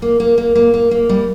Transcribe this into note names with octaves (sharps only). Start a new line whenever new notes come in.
A#3
A#3
A#3
A#3
A#3
A#3
G3